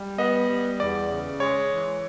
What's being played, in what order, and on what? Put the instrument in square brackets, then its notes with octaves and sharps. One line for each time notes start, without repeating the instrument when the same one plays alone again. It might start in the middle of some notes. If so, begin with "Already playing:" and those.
Already playing: [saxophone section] G3
[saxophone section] B3 [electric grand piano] D#5
[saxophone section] G3
[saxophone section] E2 [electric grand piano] D5
[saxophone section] C#3
[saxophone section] G#3 [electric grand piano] C#5
[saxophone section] E3